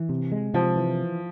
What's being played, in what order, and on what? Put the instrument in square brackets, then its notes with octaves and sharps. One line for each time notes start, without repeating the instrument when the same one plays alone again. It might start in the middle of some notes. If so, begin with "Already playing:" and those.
Already playing: [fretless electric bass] E3
C3
G#3
[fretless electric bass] C3 [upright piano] F3
[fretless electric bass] E3